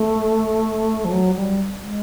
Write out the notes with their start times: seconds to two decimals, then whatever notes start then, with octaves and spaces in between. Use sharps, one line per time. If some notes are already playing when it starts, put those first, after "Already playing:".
Already playing: A3
1.05 F3
1.11 F#3
1.35 G3
1.82 G#3